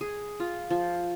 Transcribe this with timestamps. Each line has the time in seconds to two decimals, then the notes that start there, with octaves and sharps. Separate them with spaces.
0.01 G#4
0.40 F4
0.70 F3